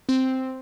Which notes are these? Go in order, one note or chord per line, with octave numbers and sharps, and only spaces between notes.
C4